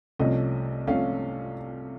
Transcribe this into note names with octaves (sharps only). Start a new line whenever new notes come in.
C2 C3 F3 A3 C#4 D#5
C3 F3 A3 C#4 F5